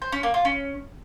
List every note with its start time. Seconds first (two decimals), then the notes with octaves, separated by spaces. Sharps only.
0.02 C5
0.12 C#4
0.23 A#3
0.34 F4
0.45 C#4